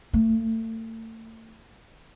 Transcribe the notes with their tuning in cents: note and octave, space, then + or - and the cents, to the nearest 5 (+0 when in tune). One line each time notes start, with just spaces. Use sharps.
A3 +35